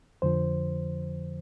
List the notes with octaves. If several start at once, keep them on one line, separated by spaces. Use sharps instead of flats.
F2 D3 F3 C5